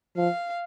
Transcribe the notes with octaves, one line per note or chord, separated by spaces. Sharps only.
F3 F5